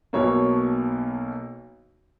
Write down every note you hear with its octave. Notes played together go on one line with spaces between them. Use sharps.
B1 B2 A#3 C#5